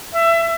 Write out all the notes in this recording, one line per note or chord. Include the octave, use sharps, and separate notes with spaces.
E5